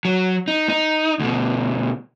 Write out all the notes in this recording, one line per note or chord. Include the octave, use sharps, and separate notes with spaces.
F#3
D#4
D#4
D2 B2